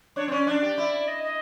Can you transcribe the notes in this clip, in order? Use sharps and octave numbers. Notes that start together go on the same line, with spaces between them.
D4 C#5
C4
C#4 D5
D4
G4
E4
D#5
D#5